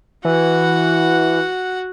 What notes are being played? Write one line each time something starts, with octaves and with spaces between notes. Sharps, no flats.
E3 F#4 F#5